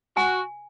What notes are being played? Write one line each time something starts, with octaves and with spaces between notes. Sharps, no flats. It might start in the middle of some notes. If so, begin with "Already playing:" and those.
F#4 G#5